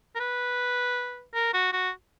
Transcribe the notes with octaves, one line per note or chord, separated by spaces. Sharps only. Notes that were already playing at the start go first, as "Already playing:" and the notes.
A#4
B4
A#4
F#4
F#4